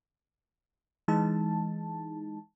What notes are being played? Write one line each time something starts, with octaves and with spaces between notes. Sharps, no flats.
E3 G#3 D#4 A5